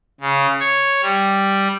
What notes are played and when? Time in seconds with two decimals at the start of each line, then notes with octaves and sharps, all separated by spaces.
0.21 C#3
0.60 C#5
1.03 G3